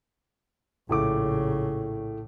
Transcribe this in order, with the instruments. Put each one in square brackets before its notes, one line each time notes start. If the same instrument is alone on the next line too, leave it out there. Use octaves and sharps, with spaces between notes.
[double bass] A#1 C#3 [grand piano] A2 A3 D6